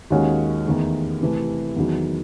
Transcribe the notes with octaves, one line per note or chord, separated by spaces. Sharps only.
D#2 D#3 G#3 C#4 F#4
E2 D#3 A3
C3 E3 A3
E2 D#3 F#3